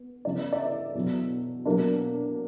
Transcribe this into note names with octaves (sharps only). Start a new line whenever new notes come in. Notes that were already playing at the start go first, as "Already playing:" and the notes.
Already playing: B3
C#3 E3 G3 B3 D5
D5
E5
E2 B2 F#3
B2 F#3 A#3 D4